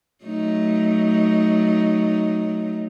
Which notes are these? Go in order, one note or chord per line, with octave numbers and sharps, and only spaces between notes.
F#3 A3 D#4